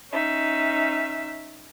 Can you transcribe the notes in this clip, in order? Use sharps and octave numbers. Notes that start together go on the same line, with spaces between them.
C#4 D#4 E5